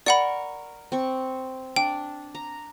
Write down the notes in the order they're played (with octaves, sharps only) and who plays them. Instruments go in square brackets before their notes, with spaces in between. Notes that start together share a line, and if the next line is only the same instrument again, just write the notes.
[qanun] A#4 C#6 [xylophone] D5 F#5 B5
[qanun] C4 C#6
[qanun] D4 [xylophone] G5
[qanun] A#5